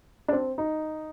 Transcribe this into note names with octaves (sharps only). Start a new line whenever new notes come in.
D4
C4
D#4